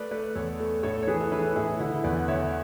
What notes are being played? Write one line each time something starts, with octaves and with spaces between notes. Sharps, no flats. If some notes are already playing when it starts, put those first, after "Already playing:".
Already playing: A3 B4 D5
A3 B4 D5
E2 A4 C#5
A3
A2 A4 C#5
C#5
E3 G#4 B4
A4
E3 G#4 B4
A2 E4 G#4
D3 E4
E2 B4 D5
D3 C#5 E5